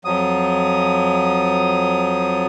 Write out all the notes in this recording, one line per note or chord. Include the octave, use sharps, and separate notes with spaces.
F2 F3 F#3 D#6